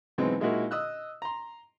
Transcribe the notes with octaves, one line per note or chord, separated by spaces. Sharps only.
B2 E3 F#3 G#3 C4 D#4
A#2 G#3 D#4 E4 F#4 A#4
D#5 D#6 E6 F#6
A#5 C6